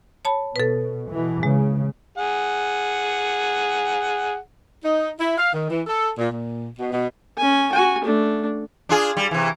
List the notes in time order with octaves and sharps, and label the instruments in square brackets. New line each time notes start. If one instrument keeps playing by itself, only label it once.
[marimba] C#5 A5 B5
[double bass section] B2 [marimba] A4 B4
[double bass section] B2 E3
[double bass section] C#3 [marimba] G#3
[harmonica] G#4 F#5
[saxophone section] D#4
E4
F5
D#3
E3
A4
A#2
A#2
B2
B2
[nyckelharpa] C#4 G#5
F#4 G#5
A3 D4
[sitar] D4 F4 G#4
G3
C3 E3